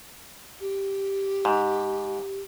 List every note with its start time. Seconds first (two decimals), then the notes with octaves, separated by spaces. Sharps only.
0.60 G4
1.45 G#2